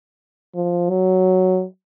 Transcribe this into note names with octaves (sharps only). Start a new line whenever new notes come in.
F3
F#3